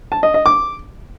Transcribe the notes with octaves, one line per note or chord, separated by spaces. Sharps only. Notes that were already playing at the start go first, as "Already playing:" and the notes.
A5
D#5
D#5
D6